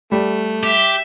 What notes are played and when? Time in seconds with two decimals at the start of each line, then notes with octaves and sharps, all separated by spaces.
0.12 G3 A3
0.63 G4 E5